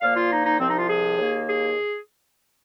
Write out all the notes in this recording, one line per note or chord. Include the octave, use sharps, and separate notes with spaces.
A#2 F3 A#3 F5
F4
D#4
D#4
C2 C3 F3 C4
D#4
F4
G#4
D#2 D#3 A#3
G#4